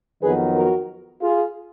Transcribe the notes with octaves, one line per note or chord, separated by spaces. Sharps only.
F2 D#3 F#3 B3 G#4 B4
F#4 A#4
F4 G#4